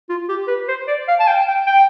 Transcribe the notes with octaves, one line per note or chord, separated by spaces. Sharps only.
F4
G4
B4
C5
D5
F5
A5
G5
G5
G5